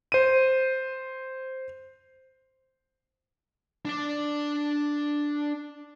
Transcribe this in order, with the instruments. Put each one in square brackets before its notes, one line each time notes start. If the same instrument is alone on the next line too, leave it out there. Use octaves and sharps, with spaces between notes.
[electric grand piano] C5 D#7
[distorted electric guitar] D4 D5